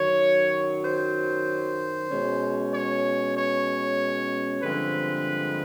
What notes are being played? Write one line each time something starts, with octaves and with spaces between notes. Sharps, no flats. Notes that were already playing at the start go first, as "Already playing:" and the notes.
Already playing: F#2 D#3 F#3 C#5
C5
B2 G#3 C#4
C#5
C#5
G2 D3 F3 G#3 C4 B4